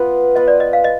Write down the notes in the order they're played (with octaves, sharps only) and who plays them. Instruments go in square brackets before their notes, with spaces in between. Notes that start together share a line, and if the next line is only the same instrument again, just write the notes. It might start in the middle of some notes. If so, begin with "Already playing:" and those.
Already playing: [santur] B3 F4 B4
[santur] B3 F4 B4 [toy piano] D#5
[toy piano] D5
D#5
F5
D#5